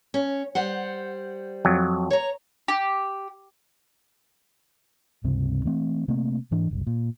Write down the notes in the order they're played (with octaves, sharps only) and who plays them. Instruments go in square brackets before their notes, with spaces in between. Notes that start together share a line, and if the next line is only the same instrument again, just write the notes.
[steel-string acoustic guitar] C#4
G3 C5 F#5
[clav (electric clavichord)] F2 F#3
[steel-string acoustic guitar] C#5 A#5
[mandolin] G4
[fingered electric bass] C#2 G2 C3 C4
E3 A3 C4
C3 A3 A#3 C4
G#2 E3 D4
F#1 C2
A#2